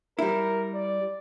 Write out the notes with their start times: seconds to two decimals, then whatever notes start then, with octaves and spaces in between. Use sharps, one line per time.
0.19 G3 E4 A#4
0.74 D5